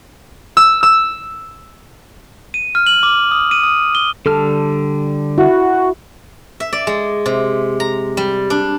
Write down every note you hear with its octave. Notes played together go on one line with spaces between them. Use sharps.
E6
E6
D#7
F6
F#7
D6
D#6
D#7
D#6
G7
D3 G3 A4 F6
E4 F#4
E5
D5
G#3
C3
A#5
G3
D4